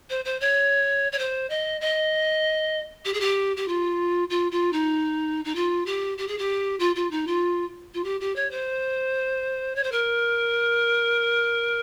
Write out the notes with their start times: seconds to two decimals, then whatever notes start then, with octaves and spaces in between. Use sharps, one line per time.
0.10 C5
0.25 C5
0.40 C#5
1.12 C#5
1.18 C5
1.50 D#5
1.81 D#5
3.05 G4
3.14 G#4
3.20 G4
3.56 G4
3.68 F4
4.30 F4
4.51 F4
4.72 D#4
5.45 D#4
5.55 F4
5.86 G4
6.18 G4
6.28 G#4
6.38 G4
6.79 F4
6.95 F4
7.11 D#4
7.27 F4
7.94 F4
8.04 G4
8.20 G4
8.36 C#5
8.51 C5
9.75 C#5
9.83 C5
9.91 A#4